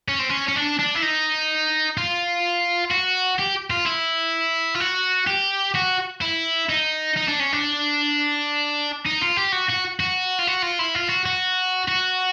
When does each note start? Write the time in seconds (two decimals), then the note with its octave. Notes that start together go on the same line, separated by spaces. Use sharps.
0.08 C#4
0.19 C4
0.29 C#4
0.48 C#4
0.56 D4
0.79 D4
0.95 E4
1.02 D#4
1.97 F4
2.91 F#4
3.39 G4
3.70 F4
3.87 E4
4.75 F4
4.80 F#4
5.27 G4
5.75 F#4
6.21 E4
6.69 D#4
7.17 D#4
7.28 D4
7.40 C#4
7.53 D4
9.06 D#4
9.21 F4
9.36 G4
9.52 F#4
9.69 F#4
10.00 F#4
10.39 F4
10.47 F#4
10.63 F4
10.79 E4
10.95 F4
11.09 F#4
11.26 F#4
11.88 F#4